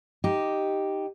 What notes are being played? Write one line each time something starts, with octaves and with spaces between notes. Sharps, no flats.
D#4 G4